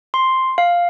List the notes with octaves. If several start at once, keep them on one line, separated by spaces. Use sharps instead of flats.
C6
F5